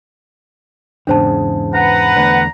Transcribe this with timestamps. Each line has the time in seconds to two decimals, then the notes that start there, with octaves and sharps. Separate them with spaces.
1.07 E2 G#2 C#3 D4 C5 A5
1.74 B4 F#5 A#5
2.16 E2 D3 A3